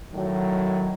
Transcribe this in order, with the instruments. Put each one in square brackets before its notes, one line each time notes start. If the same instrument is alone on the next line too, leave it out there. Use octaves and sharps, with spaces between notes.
[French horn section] A2 D#3 F#3